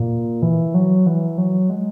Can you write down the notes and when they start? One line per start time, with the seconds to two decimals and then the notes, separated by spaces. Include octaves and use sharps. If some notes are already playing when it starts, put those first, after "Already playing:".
Already playing: A#2
0.42 E3
0.74 F#3
1.06 E3
1.38 F#3
1.70 G#3